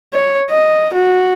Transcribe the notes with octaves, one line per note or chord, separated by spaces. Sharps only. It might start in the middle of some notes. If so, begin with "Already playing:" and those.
C#5
D#5
F#4